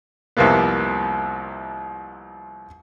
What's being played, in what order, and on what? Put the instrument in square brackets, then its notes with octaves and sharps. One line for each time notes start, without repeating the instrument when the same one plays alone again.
[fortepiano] C2 F2 C3 A#3 B3